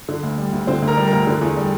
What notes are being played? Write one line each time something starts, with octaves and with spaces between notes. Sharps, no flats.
D3
D2
G3
D2
D3 C4 C5
D2
A#4 A#5
G3
A#4 A#5
D2
D3
E2
G3